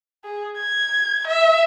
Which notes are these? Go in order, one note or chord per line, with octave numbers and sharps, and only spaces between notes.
G#4
G#6
E5